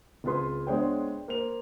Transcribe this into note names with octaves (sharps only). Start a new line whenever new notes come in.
C#2 C4 F4 G#4 B4 C6
G#3 B3 D4 C5 C#5 G5
A#3 C5 F7